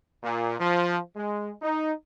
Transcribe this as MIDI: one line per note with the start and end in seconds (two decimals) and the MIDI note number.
0.23 0.54 46
0.58 0.98 53
1.16 1.52 56
1.62 1.91 63